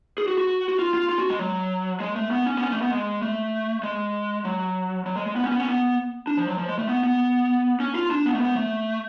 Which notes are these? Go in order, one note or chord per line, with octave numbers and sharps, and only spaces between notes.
G#4
F#4
F#4
F#4
F4
F4
F4
F#4
G#3
F#3
G#3
A3
B3
C#4
B3
C#4
A3
B3
G#3
A3
G#3
F#3
F#3
G#3
G#3
B3
C#4
B3
C#4
B3
D4
F3
F#3
F3
G#3
A3
B3
B3
C#4
F4
D4
B3
A3
B3
A3